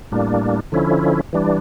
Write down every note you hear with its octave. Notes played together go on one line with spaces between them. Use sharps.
A2 G3 A#3 D4
D3 F3 C#4 E4
E3 G3 D4